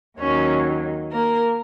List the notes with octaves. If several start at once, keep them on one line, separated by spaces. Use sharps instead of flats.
D#2 D#3 F#3 C#4 C#5
A#3 A#4